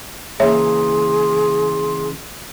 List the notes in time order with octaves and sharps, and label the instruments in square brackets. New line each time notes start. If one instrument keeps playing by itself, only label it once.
[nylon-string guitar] C#3 E3 A#3 [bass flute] G#4 [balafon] C#5 E5 [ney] C6